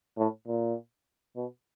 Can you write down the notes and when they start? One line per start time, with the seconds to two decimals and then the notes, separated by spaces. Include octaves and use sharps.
0.18 A2
0.47 A#2
1.36 B2